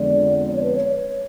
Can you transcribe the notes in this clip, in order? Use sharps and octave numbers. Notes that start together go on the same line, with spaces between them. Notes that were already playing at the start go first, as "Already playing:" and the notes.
Already playing: F2 D3 G#3 B3 D5
D5
C#5
B4
C#5